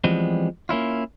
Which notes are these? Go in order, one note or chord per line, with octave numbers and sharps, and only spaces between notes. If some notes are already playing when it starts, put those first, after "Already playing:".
E3 F3 G3 G#3 B3 C4
A#3 C#4 E4 F4